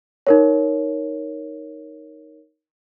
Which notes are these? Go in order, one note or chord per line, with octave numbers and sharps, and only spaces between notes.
D#4 A#4 C#5